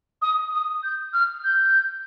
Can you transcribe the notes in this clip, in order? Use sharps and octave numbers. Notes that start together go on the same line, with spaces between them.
D#6
D#6
G6
F6
G6